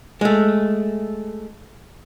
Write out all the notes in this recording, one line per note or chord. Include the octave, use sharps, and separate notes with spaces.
G#3 A3